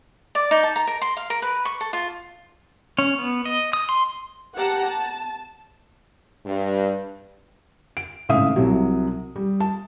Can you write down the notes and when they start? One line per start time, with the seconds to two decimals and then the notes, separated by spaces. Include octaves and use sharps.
0.35 D5
0.51 D#4
0.63 A5
0.76 A#5
0.87 A#4
1.02 C6
1.17 F5
1.30 A#4
1.42 B4
1.65 C#6
1.81 A4
1.93 F4
2.98 C#4
3.19 B3
3.45 D#5
3.73 D#6
3.89 C6
4.56 G4 F#5 A5 A#5
4.86 A5
6.45 G2
7.97 D7
8.29 G#1 A2 C#3 E5 F5 D#6
8.56 C2 C3 F#3
9.36 G3
9.60 A5